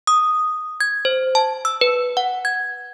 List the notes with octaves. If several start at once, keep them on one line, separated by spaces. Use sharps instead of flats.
D#6
G#6
C5
A5
E6
B4
F#5
G#6